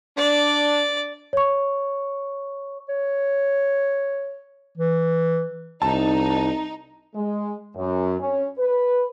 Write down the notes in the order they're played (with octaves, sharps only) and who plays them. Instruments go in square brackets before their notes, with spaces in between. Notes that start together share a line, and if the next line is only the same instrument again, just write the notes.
[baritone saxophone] D4 [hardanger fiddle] D5
[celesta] C#5 C#6
[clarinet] C#5
E3
[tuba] C2 [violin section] D#4 [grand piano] A5
[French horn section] G#3
F#2
C#4
B4